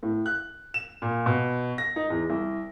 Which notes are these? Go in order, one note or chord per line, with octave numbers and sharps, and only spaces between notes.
A2
F#6
E7
A#2
B2
A#6
D#4
E2
C2